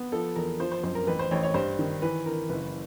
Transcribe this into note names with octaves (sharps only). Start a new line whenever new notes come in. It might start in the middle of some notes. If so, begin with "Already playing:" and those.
Already playing: B3
F3 A4
E2 A#4
F3 C5
C5
F#2 C5
A#4
A1 B4
C5
A1 C#5
C#5
G2 C5
D#3
E3 B4
E3 A#4
F#1 B4